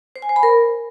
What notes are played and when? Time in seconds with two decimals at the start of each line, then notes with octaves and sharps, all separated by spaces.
0.16 C5
0.22 G#5
0.29 C5
0.36 B5
0.43 A#4